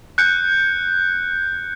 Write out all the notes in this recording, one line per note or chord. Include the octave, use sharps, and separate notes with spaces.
F#6 G6 C#7